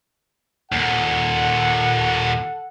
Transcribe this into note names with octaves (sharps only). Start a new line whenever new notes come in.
D#2 A#2 A4 F#5